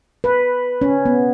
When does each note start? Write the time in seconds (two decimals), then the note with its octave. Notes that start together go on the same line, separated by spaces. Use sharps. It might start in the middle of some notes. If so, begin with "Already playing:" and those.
0.24 B4
0.82 C#4
1.05 B3